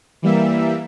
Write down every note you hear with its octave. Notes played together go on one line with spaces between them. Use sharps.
E3 G3 A#3 E5